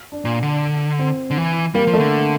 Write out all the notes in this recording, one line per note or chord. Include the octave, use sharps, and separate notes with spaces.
D4
A#2
D3
C4
D3
E3
G3 A#3
F3
A3
D3